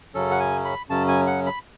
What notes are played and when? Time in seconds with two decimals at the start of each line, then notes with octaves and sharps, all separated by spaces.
0.14 F#2 C#3 F#3 C#4 A4
0.31 F#5
0.40 G#5
0.65 B5
0.89 F#2 C#3 F#3 C#4 A5
1.08 G#5
1.27 F#5
1.46 B5